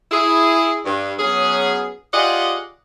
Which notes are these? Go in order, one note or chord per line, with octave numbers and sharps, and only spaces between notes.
E4 G#4
G2
F#3 B3 C#4 G#4
F4 G4 G#4 D5 D#5 F#5